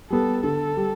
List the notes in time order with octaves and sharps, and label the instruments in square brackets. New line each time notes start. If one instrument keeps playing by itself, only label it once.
[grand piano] G3 B3 [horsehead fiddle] A4
[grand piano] D3 [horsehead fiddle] A4
[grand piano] G3